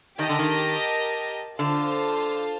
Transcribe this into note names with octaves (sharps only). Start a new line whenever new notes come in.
D#3 G4 A#4 D#5 A5
D3
D#3
D3 F4 C5 F5 A5